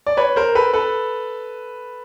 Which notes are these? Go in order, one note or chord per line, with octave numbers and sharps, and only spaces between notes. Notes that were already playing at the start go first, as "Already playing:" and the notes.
D5
B4 C#5
A#4 C5
A4 B4
A4 B4